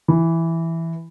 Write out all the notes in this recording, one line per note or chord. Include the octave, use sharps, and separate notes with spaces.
E3